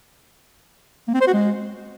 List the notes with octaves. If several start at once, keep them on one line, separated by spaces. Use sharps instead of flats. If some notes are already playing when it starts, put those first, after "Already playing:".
A#3
C4
C5
F#4
G#3